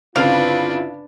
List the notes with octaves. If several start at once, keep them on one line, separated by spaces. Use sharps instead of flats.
G1 C#3 C4 D4 E4 F4 B4 F5